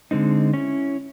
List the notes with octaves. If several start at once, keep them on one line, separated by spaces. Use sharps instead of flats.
D3 G#3 C4 D#4
C#4 E4